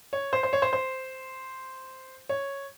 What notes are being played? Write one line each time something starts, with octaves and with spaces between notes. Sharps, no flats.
C#5
C5
C5
C#5
C5
C5
C#5